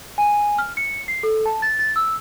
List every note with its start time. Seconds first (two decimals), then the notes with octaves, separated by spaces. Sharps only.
0.18 G#5
0.58 F6
0.77 C#7
1.08 C7
1.23 A4
1.46 A5
1.62 A6
1.79 A6
1.96 E6